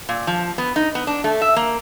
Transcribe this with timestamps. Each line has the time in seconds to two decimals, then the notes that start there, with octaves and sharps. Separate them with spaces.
0.09 A#2
0.27 F3
0.58 B3
0.76 D#4
0.95 B3
1.07 D4
1.24 A3
1.41 E5
1.56 A#3